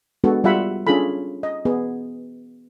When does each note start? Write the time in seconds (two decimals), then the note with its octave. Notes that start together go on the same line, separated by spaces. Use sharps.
0.24 G#3 B3 D4 F#4 A4
0.44 G3 F4 E5 F#5 B5
0.87 C#4 D4 F4 G#4 A4 B5
1.43 D#5
1.65 B3 G#4